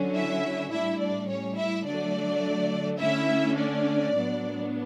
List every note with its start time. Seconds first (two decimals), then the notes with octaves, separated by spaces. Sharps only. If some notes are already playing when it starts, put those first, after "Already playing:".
Already playing: D3 F#3 C#4
0.13 E4 E5
0.71 A2 G3 D4 E4 E5
1.00 D4 D5
1.28 C#4 C#5
1.56 E4 E5
1.85 D3 F#3 A3 D4 D5
2.99 D3 A3 C#4 E4 E5
3.56 D4 D5
4.14 A2 F#3 B3 D4